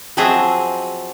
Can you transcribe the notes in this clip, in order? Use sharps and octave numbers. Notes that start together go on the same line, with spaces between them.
F3 F#3 C4 G#4 D#5 E5